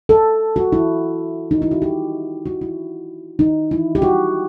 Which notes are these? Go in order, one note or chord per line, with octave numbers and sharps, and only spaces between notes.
A4
F#4
E4
D#4
E4
F#4
G4
F#4
E4
D#4
E4
G4
F#4